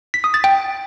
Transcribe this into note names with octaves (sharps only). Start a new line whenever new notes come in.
B6
D#6
A6
G5